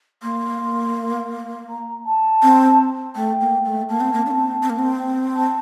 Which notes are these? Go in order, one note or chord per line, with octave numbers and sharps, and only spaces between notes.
A#3 C6
A#5
A5
C4
A3 G5
A#3
A3
A#3 A5
C4
A#3
D4
C4
C4
A#3
C4
A5